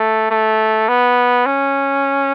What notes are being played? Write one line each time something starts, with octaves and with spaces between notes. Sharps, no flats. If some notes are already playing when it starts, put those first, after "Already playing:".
Already playing: A3
A3
B3
C#4